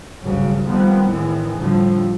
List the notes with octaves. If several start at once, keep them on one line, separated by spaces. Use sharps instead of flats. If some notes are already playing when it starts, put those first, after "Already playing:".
G#1 D2 G2 C#3 F#3
D#3 F3 G3 A3 B3 C4
A2 D#3 E3 G#3
A2 D3 F3 G3